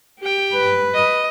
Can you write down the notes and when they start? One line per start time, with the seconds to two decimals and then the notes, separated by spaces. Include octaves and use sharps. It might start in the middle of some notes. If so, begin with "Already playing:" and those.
0.20 G4 G5
0.54 B4
0.94 D#5